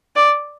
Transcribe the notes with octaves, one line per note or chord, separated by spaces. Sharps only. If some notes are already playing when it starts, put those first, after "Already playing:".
D5